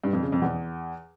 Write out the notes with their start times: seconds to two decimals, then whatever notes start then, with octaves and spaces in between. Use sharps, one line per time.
0.04 G2
0.13 F2
0.23 C#3
0.32 F2
0.42 E2